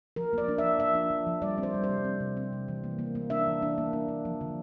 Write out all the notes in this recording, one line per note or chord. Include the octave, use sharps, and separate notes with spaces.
F3 A#4
A#3 D5
D4
E5
F3
F3 E5
D4
F3
F3
G3 D5
C4
C5
G3
C5
C3
C4
C3
C4
C3
E3
A#3
A#3
A#3
D4 E5
E3
D4
A#3
D4
A#3
F3
D3